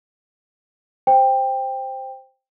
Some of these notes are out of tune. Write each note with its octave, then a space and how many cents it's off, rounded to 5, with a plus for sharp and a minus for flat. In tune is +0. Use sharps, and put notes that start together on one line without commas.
C5 +0 G5 +10